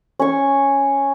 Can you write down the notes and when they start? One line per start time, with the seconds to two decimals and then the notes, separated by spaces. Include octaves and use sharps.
0.19 C#4 C#6